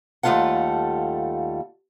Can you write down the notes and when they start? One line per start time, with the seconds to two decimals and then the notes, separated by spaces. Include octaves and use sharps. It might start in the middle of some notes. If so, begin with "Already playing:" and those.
0.23 D#2 G3 A3 F4 A4 F#5